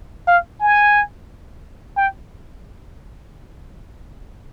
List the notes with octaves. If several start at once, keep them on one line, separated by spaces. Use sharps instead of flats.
F5
G#5
G5